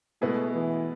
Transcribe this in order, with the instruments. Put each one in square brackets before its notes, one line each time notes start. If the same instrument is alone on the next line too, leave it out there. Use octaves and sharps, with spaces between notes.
[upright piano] B2 G#3 B3 E4 G#4 [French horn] A3
[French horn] E3